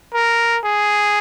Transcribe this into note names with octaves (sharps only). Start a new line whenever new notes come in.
A#4
G#4